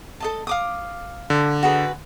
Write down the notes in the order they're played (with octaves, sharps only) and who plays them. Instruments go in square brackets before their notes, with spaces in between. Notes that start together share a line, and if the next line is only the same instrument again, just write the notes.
[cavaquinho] A4 D#5 A5
F5 D6 D#6
[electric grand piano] D3
[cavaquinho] F#4 G#4 B4